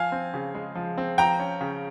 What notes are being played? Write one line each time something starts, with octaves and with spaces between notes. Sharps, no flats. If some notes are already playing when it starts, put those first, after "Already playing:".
Already playing: F3 F5 G#5
C4
C#3
G#3
F3
C4
F3 G5 A#5
C#4
C#3